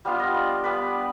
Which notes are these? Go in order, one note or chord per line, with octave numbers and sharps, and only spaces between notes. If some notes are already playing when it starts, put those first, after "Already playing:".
G3 B3 D4 F4 F5
D#5
D5
G3 B3 D4 B4